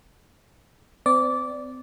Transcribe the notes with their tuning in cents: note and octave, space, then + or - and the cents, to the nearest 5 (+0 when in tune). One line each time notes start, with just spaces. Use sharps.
C4 -35 D5 -15